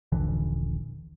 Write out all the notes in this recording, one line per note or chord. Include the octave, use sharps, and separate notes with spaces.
D#1 A#1 D3 E3